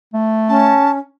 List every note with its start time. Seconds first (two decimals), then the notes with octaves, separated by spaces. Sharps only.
0.14 A3
0.49 C#4 A5